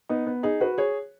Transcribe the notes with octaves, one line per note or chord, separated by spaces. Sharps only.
B3 D#4
B3
D#4 G#4
F#4 B4
G#4 C#5